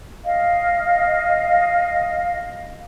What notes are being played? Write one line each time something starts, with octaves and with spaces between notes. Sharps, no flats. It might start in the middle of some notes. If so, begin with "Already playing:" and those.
D#5 F5